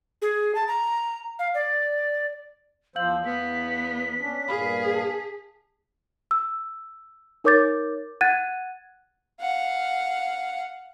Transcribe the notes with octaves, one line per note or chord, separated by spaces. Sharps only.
G#4
A5
A#5
F5
D5
E2 F3 C5 F5 E6 G6 F#7
E2 B3 B6
C#4 D4
G2 A#2 G#4 F5 B5
A5
E6
D#4 A#4 C#5 D6 G6 A6
F#5 F#6 G#6 A6 D#7
F5 F#5